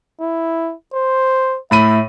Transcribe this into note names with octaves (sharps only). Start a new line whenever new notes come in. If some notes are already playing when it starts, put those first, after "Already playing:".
E4
C5
A2 E5 B5 D#7